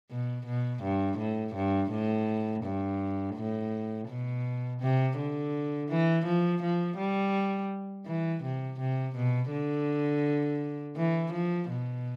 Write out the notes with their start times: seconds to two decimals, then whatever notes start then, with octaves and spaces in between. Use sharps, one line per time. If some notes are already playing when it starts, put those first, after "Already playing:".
0.11 B2
0.46 B2
0.83 G2
1.18 A2
1.55 G2
1.90 A2
2.64 G2
3.36 A2
4.08 B2
4.80 C3
5.17 D3
5.89 E3
6.25 F3
6.62 F3
6.97 G3
8.06 E3
8.43 C3
8.79 C3
9.16 B2
9.51 D3
10.96 E3
11.32 F3
11.69 B2